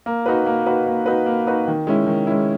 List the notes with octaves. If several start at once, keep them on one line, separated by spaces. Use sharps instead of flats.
A#3
D#4 F#4 B4
A#3
D#4 F#4 B4
A#3
D#4 F#4 B4
A#3
D#4 F#4 B4
D#3
G#3 C#4 E4
D#3
G#3 C#4 E4